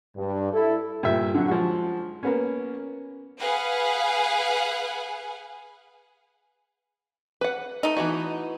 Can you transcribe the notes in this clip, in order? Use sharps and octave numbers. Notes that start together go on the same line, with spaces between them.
G2
E4 A4
G2 A#2 E5
D3 F#3
F3 G#3 F#4
A#3 B3 C#4
G#4 B4 F5 F#5 G#5
B4 F#5
A3 D#4
E3 B3 F#4